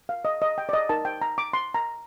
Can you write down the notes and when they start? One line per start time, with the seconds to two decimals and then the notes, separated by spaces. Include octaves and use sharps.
0.09 F5
0.25 D#5
0.42 D#5
0.58 G5
0.69 D5
0.73 D#5
0.89 D#4 A#4 A5
1.05 G5
1.22 A#5
1.38 D6
1.53 C6
1.74 A#5